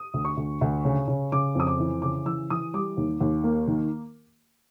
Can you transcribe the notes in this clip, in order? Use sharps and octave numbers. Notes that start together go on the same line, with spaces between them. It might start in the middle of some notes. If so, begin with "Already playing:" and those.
Already playing: D#6
D2
C#6
D2
D2
C#3
C#3
C#3 D6
F2 D#6
D6
E3
C#3 D6
E3 E6
E3 D#6
G3 D6
D#2
D#2
A#3
D#3